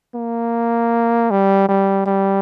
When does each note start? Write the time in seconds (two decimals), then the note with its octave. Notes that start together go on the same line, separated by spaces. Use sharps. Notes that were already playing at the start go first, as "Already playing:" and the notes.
0.15 A#3
1.31 G3
1.69 G3
2.06 G3